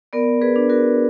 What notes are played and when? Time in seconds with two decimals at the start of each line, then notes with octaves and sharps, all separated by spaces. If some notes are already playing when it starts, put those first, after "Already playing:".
0.13 B3 A#4 D5
0.41 G#4 B4
0.56 D4
0.69 F#4 A#4